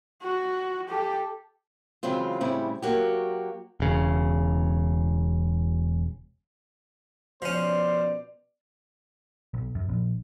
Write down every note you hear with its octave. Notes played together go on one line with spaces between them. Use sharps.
F#4
G4 A4
C#3 E3 F#3 G#3 C4 F4
A2 C#3 G3 C4 E4
F#3 A#3 F#4 G4
E1 C#3
B2 F3 C#4 C5 D5
B1
F#2
A#1